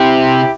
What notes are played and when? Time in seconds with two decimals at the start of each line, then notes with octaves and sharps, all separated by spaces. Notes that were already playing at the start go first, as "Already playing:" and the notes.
Already playing: C3 E4 G4